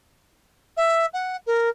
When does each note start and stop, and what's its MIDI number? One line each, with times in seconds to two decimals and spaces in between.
0.77 1.06 76
1.13 1.37 78
1.46 1.69 70